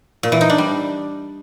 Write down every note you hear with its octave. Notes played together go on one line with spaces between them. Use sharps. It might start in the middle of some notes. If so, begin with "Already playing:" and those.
A#2
E3
D#4
D4
G3